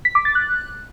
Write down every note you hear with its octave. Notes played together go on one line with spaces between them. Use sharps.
B6
D6
A6
F#6